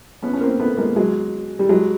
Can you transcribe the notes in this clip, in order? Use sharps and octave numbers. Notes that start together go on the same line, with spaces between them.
B3 C#4
C#4
A#3 C4
A3 B3
G#3 A#3
F#3 G#3
G3
F#3 G#3